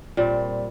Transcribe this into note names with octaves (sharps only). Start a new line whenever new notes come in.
A#2 G3 C4